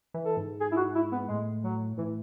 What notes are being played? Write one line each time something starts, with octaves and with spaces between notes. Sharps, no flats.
E3
A4
G#2
G#4
E4
F#4
E4
B3
A2 G#3
F#3
A2 E3